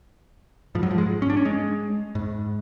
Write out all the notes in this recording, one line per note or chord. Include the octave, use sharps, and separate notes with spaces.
G#2 F3
F#3
F3
G#3
C#4
D4
C#4
G#3
G#2